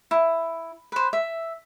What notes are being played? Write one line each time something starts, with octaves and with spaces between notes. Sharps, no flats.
E4
B4 C5
E5